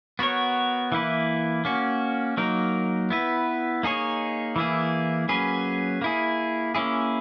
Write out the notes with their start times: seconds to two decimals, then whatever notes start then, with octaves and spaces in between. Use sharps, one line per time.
0.19 B3 F#4 A#4 C#5
0.92 E3 A#3 E4 B4
1.65 A#3 C#4 F#4
2.37 F#3 A#3 D#4 A#4
3.10 B3 E4 B4
3.83 A#3 D#4 G#4 C#5
4.56 E3 A#3 E4 G#4
5.29 F#3 A#3 C#4 G#4 B4
6.02 A#3 E4 G#4
6.75 A#3 C#4 E4 G#4